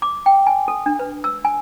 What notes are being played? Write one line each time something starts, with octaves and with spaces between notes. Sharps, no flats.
D6
G5
G#5
A4
D4
B4
E6
G#5